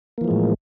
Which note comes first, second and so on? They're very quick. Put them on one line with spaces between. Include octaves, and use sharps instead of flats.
A#3 E3 F3 G#3 A2